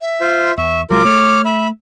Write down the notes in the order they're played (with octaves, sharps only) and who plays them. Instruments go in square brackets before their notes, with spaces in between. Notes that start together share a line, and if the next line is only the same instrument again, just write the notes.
[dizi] E5
[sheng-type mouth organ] F4 C5
[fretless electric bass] E2 [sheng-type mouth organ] E5 [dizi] C#6
[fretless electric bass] C2 F#3 G#3 [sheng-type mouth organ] F4 A#4 [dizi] D6
[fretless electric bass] A3 [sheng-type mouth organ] C#5 F6
[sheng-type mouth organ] E5 [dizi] B5